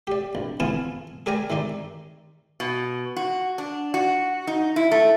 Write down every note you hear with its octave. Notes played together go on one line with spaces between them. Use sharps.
G4 D5
A#1
E2 B3 F4 G#5 A5
G#4 A#4 D5 G5 G#5 A#5
D#3 G#3 D#4 D5
B2
F#4
D4
F#4
D#4
E4
A3